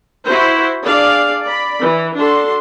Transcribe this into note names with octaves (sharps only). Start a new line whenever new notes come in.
E4 F#4 C5
D4 G#4 D5 F5
D5 B5
E3
D4 F#4 A4 C6